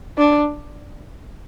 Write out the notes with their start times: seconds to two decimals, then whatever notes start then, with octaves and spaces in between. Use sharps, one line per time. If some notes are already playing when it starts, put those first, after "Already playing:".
0.18 D4